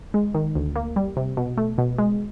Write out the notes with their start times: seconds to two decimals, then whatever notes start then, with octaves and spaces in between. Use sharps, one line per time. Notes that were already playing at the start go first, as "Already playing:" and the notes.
0.14 G#3
0.35 D#3
0.55 D2
0.76 A#3
0.96 G3
1.17 C3
1.37 B2
1.57 A3
1.78 B2
1.98 G#3